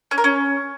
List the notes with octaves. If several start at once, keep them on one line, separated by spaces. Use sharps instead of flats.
C#4
A#4
C#4